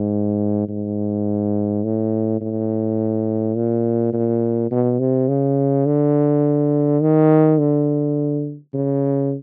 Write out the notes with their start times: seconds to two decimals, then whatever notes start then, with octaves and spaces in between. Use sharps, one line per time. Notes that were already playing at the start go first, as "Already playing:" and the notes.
Already playing: G#2
0.68 G#2
1.84 A2
2.41 A2
3.55 A#2
4.13 A#2
4.71 B2
4.99 C3
5.28 C#3
5.86 D3
7.01 D#3
7.58 D3
8.74 C#3